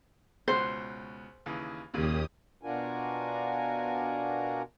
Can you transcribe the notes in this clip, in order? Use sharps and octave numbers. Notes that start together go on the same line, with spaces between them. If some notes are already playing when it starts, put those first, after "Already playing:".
C#2 B2 C5 F#5
D#2 C#3 E3
D#2 A#2 C#3 G4 D#6
B2 D4 F4 F#4 A#4 G#5